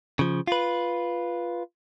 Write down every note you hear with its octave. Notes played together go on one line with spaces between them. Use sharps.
C#3 F3
F4 B4